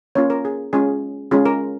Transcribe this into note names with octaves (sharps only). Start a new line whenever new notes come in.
A#3 C#4 F4 C#5
A#4
G#4
G#3 C#4 F4 G#4
G#3 C#4 F4 G#4
A#4